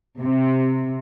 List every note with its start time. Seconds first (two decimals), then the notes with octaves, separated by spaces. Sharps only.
0.20 C3